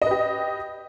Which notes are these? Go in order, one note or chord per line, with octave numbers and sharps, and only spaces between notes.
G4 B4 D#5